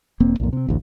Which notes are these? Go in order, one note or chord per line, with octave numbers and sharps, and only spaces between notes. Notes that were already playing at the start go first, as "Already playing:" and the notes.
E1 A#3 C4
B1 F2 A#2
C3 C4
A1 D2